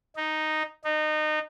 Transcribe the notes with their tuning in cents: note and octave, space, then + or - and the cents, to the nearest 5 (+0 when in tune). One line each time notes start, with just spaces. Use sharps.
D#4 -5
D#4 -25